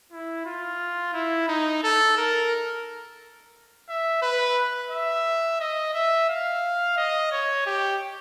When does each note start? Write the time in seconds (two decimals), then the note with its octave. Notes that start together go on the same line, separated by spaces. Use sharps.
0.12 E4
0.46 F4
1.14 E4
1.48 D#4
1.83 A4
2.18 A#4
3.89 E5
4.22 B4
4.91 E5
5.60 D#5
5.94 E5
6.29 F5
6.97 D#5
7.32 C#5
7.66 G4